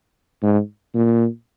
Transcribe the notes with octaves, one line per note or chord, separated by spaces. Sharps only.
G#2
A#2